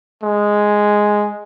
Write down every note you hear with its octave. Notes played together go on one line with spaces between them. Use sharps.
G#3